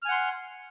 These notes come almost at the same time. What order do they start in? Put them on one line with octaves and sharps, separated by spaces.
F6 G#5 F#5 C6